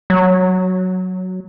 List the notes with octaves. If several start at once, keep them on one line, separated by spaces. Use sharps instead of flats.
F#3